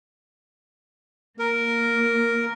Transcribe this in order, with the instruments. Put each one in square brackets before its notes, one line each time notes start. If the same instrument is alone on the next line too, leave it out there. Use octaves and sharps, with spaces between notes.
[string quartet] A#3 [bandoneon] A#4